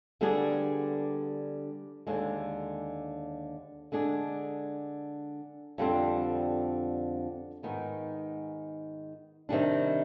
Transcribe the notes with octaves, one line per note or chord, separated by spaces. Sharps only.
D3 G3 B3 D4 G#4
D#2 D3 G#3
D3 G#3 D4 G#4
F2 D3 G3 C4
G#2 D#3 B3 D#4
C3 D#3 G3 D4